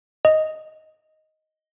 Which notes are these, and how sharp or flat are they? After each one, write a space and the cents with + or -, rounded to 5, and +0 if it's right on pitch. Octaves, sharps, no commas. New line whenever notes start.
D#5 +5